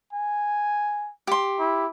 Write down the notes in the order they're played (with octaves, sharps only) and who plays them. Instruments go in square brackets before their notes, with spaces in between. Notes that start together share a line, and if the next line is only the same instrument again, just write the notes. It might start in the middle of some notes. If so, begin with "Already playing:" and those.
[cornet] G#5
[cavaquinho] G4 C6
[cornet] E4